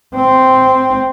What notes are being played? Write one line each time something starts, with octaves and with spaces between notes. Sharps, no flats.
C4